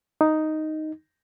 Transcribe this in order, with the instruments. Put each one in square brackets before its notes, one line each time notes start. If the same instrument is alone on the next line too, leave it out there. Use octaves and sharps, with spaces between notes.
[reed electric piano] D#4